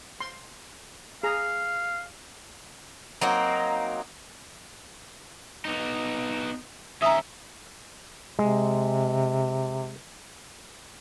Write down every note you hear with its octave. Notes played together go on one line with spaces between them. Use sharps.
C6
G#4 F5 A#5
F#3 A#3 C4 D#4
B3 D#4
D#2 C#4 E5 A#5 D#6
C3 G#3